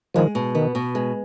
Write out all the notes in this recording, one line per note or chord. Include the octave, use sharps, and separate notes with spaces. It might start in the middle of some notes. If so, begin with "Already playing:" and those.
D#3 F3 G#3
B2
D#3 B3
B2
G#3